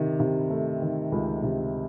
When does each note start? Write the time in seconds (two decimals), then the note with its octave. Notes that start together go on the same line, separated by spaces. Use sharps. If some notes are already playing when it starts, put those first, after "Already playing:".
Already playing: C3 D#3
0.20 C3
0.50 A3
0.82 D#3
1.12 C#2
1.43 C3